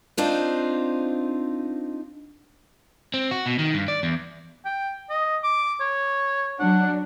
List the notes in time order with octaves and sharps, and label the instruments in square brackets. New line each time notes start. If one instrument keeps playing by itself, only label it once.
[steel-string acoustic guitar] C4 D4 D#4 F4 C5 F5
[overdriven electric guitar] C4
F#4
B2
D#3
G2
D5
E2
[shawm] G5
D#5
D6
C#5
[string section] F#3 D4 [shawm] F#5